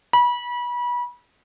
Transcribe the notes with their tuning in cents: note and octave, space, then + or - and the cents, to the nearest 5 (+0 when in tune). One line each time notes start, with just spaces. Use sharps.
B5 -30